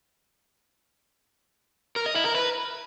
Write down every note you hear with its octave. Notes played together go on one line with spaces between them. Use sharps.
A#4
D#5
E4
A#4
B4